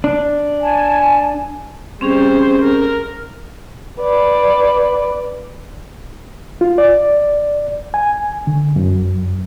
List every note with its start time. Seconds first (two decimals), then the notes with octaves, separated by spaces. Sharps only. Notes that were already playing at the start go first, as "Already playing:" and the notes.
0.04 D4
0.61 G#5 A5
2.01 G3 C4 C#4 G#4 C5
2.62 A#4
4.00 B4 D5
6.61 F4
6.78 D5
7.94 G#5
8.47 D3
8.76 F#2